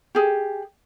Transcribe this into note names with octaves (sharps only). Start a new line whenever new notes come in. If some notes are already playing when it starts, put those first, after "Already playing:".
G4 G#4